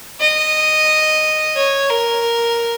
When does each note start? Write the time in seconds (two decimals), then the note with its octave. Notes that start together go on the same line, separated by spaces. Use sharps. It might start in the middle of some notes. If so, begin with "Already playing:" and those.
0.21 D#5
1.56 C#5
1.90 A#4